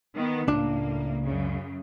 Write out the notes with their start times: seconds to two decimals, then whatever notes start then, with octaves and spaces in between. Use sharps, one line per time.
0.16 D#3 B3
0.48 C#2 A2 A#3 D4
1.24 F#2 C#3